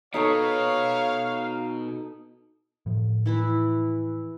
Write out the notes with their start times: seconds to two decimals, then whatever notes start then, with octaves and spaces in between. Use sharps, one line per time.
0.14 B2 D#4 A4 C#5 F5 C#6
2.86 A2 F3
3.26 E3 E4 B4